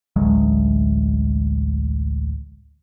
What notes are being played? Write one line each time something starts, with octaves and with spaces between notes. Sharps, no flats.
A1 D2 F#3 G#3